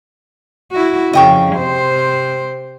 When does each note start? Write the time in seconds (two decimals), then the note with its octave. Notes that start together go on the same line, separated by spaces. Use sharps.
0.72 E4 F#4
1.13 F2 C#3 D#5 G5 C#6
1.56 C3 C5